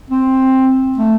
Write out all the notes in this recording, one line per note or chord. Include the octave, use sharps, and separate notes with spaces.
C4
A3